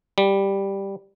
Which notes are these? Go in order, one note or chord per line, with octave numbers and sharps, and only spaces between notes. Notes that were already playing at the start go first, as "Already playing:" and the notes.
G3